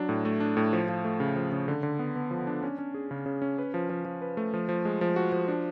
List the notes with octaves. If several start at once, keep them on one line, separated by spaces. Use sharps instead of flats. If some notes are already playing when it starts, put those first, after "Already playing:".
Already playing: F#3 D4
A2
A3
D4
A2
F3
F3
A3
C#3
F3
C#3
D3
D3
B3
B3
F3
D4
C#4
C#4
G#4
C#3
C#3
C#4
B4
F3
F3
F3
B4
A3
F3
F3
G#3
F3
F#4
F3
D4